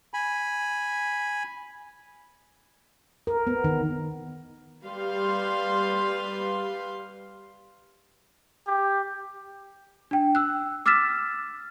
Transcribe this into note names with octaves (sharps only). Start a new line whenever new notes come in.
G#5 B5
A#4
B3
D#3
G3 B4 F5 C6
G4
D4 G5
E6 F#6
D6 E6 F6 A6 B6 E7